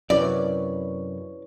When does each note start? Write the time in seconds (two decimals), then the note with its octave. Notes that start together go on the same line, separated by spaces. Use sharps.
0.10 F#2 C3 E4 B4 C#5 D5